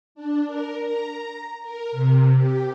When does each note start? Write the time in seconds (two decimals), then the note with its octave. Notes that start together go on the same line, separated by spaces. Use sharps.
0.15 D4
0.46 A#4
0.82 A#5
1.62 A#4
1.91 C3
2.36 G4